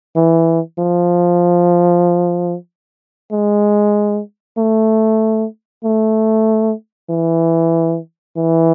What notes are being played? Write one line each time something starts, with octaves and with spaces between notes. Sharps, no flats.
E3
F3
G#3
A3
A3
E3
E3